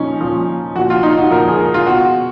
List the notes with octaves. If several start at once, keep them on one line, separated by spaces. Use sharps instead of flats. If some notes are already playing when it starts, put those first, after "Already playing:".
Already playing: A#2 F3 C#4 D#4
A#2 F3
A#2 F3 F#4
F4
D#4
F#4
A#2 F3 A#4
G#4
A#4
F4
B2 F#4